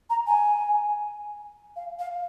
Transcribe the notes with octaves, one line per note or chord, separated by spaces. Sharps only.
A#5
G#5
F5
F5